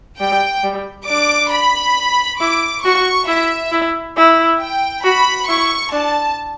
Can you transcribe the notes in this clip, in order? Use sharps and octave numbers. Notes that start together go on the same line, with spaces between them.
G3 G5
G3
D4 D6
B5
E4 D6
F#4 C#6
E4 E5
E4
E4
G5
F#4 B5
E4 C#6
D4 A5